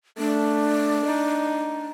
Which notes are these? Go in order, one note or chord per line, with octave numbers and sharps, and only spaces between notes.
A3 D4
D#4